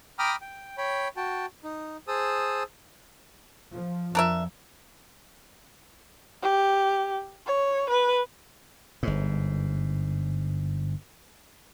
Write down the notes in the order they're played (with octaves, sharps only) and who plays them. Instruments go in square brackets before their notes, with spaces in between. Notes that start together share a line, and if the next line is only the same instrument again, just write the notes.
[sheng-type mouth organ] G5 A#5 B5 D6 D#6 F6
G5
C#5 G5 B5
F#4 G5 A5
D#4
G#4 C5 A5 D#6 E6
[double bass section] F3
[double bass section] F2 F3 [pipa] D4 A#4 E5
[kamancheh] G4
C#5
B4
[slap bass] G1 G#2